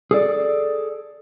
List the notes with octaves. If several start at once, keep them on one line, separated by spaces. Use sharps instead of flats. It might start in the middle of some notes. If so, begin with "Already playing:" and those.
G#4 A4 D5